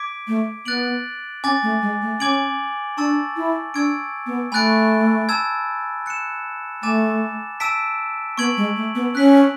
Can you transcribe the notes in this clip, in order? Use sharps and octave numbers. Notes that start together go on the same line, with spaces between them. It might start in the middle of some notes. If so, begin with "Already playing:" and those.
Already playing: D6 G#6 B6 D7
A3
B3 F#6 A6 D7 F#7
C#4 G#5 D6 A6
A3
G#3
A3
C#4 G#5 D6 G#6 D7 F#7
D4 A5 C#6 E6 A6
E4
D4 C#6 E6 G#6 D7
B3
A3 G#5 B5 F#6 A6 D7
A5 E6 G#6
F#6 C#7 E7
A3 G#5 D6 A6 E7
A5 E6 B6 D7
B3 C#6 G#6 D7 F#7
G#3
A3
B3
C#4 F#6 B6 F#7